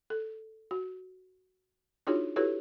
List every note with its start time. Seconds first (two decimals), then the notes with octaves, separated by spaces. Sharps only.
0.10 A4
0.71 F#4
2.07 D4 D#4 F4 F#4 G#4 C#5
2.36 E4 F#4 G4 A4 B4 C#5